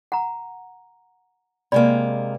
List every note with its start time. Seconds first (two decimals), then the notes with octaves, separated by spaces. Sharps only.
0.12 F#5 A#5
1.72 C3 G#3 A#3 D5 B5